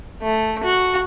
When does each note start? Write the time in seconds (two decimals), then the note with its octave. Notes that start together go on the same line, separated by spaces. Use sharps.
0.23 A3
0.64 F#4